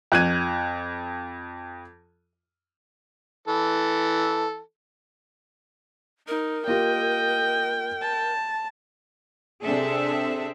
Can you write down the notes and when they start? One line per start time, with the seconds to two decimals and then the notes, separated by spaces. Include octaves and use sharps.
0.12 F2 F#6 G#6 D#7
3.48 E3 A4
6.28 D#4 A#4
6.67 A#3 F4 G4 D#5 G5
8.01 A5
9.64 C3 C4 D4 G#4 A4 E5